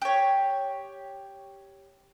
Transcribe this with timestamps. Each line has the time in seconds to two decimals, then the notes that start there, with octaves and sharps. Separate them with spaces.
0.02 G4 C#5